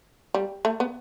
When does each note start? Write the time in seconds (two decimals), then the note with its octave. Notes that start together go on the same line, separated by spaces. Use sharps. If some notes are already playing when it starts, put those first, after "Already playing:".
0.34 G3
0.65 A3
0.80 B3